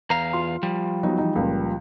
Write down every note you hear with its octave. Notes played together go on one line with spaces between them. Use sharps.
E2 F5 A#5
F4 C6
F3 G3
F#3 B3 D#4
E3 D#4
C#2 A#2